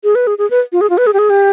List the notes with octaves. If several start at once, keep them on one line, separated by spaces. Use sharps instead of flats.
G#4
B4
G#4
G#4
B4
F4
G#4
F4
B4
G#4
G4
G#4
G4